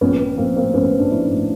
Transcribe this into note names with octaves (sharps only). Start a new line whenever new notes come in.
A#1 B3 C#4
F3
A#1 A#3 C4
A2 A#3 C4
A#1 B3 C#4
F3
C4 D4
A#1 E4
C#4 D#4
A2